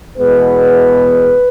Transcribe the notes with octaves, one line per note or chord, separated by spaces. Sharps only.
E2 B2 G#3 B3 B4